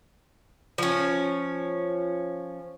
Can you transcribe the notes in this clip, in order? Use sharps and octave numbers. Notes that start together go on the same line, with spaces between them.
F3 C#4